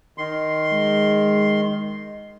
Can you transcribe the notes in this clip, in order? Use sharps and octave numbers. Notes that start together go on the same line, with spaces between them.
D#3 C6
G#3